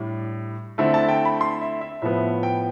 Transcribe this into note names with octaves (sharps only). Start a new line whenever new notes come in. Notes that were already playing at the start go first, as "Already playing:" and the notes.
Already playing: A2 G3 D4
D3 A3 C4 E4
A5
G5
B5
C6
E5
E5
A2 F3 B3 E5
G5